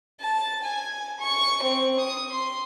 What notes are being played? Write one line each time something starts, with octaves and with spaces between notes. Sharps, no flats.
A5
G#5
C#6
C4
D#6
C6